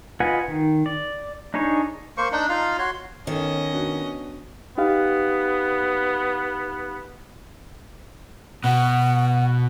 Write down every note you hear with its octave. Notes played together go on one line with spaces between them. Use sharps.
F4 B4 D#5 F#5 G#5
D#3
D5
D4 D#4 G#4 C#5
A#3 C5 C#6
D4 D#4
D#4 F4 F5
F#4 C#5 C6
D#3 B3 C#4 A4 C#5 D#5
B3 D4 F#4
B3 D#4 G4 F5
B2 F#5